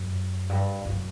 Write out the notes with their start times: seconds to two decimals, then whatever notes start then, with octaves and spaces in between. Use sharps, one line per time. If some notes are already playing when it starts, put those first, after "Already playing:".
Already playing: F#2
0.49 G2
0.85 F#2